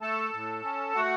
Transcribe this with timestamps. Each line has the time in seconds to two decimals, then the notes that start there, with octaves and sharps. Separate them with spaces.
0.01 A3 A4 A5
0.33 A2
0.64 C#4
0.95 A3 F#4 F#5